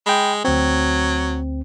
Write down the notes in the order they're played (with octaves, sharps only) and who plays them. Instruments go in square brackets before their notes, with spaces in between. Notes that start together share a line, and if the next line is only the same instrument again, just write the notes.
[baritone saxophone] G#3 [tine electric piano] G5 B5
[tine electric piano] D2 C4 [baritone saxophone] F#3